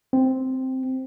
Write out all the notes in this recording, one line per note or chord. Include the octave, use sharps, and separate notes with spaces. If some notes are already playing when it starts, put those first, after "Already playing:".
C4